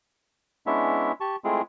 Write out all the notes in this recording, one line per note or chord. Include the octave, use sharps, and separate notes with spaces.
G#3 B3 C#4 D4 E4 E5
G4 A5 C#6
G#3 A3 C4 E4 F4 G#4